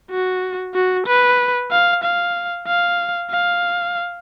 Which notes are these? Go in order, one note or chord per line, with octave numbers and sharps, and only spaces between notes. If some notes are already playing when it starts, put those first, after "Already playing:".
F#4
F#4
B4
F5
F5
F5
F5